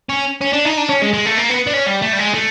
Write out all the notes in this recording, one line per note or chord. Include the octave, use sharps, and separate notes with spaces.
C#4
C#4
D4
D#4
D4
C#4
G#3
G#3
A3
A#3
B3
D4
C#4
G3
A3
G3
G#3
A3